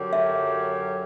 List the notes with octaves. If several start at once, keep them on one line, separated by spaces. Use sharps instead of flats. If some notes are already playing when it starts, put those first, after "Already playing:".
Already playing: F#2 D3 F#3 C#4 G4
E5